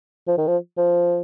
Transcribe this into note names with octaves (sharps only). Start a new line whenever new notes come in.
F3
D#3
F3
F3